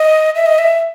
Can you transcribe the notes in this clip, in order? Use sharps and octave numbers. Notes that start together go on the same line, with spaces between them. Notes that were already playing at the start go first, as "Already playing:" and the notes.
Already playing: D#5
E5
D#5
E5